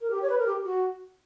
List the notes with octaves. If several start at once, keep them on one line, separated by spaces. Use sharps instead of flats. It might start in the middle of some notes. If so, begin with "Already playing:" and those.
A#4
G4
C#5
B4
A#4
G4
F#4